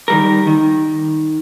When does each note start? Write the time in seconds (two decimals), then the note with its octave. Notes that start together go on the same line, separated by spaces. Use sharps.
0.08 D#3 G3 A#4
0.47 D#3